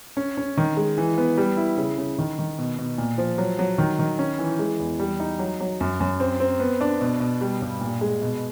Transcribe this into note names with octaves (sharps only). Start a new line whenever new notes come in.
C#4
C#4
D#3
G#3
E3
B3
G3
E4
C#3
C#3
D#3
D#3
B2
B2
A#2
F3
F#3
F#3
D#3
D#3
C#4
E3
G#3
E2
G3
D#4
F#3
F#3
F#2
F#2
C4
C4
B3
D4
B2
B2
G3
G2
A#2
G#3
B2